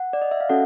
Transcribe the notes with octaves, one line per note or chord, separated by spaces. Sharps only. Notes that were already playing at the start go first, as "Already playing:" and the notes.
Already playing: F#5
D5
D#5
E5
F5
C#4 F#4 A4 F#5